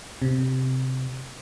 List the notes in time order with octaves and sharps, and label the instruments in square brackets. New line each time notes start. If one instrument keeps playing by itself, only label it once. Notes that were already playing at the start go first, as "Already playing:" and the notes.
[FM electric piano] C3